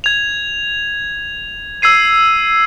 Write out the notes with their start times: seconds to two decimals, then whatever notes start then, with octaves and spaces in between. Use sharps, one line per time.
0.04 G#6 F7
1.82 E6 G#6 C7 D#7